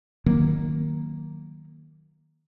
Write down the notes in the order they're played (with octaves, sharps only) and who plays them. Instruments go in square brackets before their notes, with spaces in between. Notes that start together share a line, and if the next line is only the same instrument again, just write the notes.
[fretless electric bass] D#3 F#3 A#3